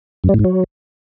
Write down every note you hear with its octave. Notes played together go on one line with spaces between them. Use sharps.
F#2
G3
A2
G#2
F#3